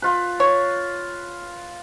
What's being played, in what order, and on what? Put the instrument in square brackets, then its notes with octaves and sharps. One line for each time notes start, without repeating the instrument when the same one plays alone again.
[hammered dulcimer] F4 B4
[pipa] C#5